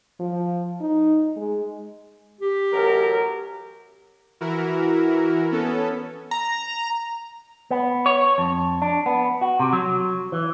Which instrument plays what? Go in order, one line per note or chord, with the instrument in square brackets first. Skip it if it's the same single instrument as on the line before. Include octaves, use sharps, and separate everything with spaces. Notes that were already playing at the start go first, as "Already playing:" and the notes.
[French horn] F3
D#4
G#3
[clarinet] G4
[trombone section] A1 F#3 A#4
[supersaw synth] E3 E4 F#4 A#4
B3 C#4 A4
[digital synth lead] A#5
[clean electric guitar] B3
C#5
F2
D4
B3
F#4
C3
F#3
E3